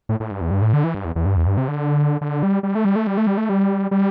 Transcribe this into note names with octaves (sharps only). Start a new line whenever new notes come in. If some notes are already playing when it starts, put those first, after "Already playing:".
A2
A2
G2
E2
G2
A2
D3
E3
G2
E2
E2
G2
E2
G2
C3
D3
D3
G3
G3
A3
G3
A3
G3
A3
G3
A3
G3
G3